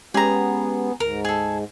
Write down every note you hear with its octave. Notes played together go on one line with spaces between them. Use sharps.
G#3 B3 C#4 G4 G#4 A#5
D2 G#2 A#4
G#4 A4